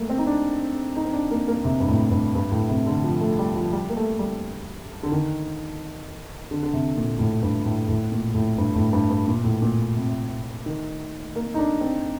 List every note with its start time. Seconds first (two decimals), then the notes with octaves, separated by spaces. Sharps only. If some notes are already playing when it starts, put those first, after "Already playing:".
Already playing: G3 A3 A#3
0.10 C4
0.18 D#4
0.26 D4
0.96 D#4
1.05 C4
1.13 D4
1.31 A#3
1.48 A#3
1.65 C3
1.80 G2
1.88 A2
2.11 G2
2.35 G2
2.51 A2
2.69 C3
2.86 D3
3.04 F3
3.21 A3
3.39 G3
3.56 F3
3.73 G3
3.90 A#3
3.97 A3
4.19 G3
5.03 D3
5.12 D#3
6.51 D3
6.63 D3
6.74 C3
6.96 A#2
7.19 A2
7.42 G2
7.66 A2
7.89 A2
8.12 A#2
8.35 A2
8.58 G2
8.75 A2
8.93 G2
9.10 G2
9.28 A#2
9.44 A2
9.62 A#2
9.96 C3
10.66 D#3
11.36 A#3
11.54 D#4
11.58 D4
11.81 C4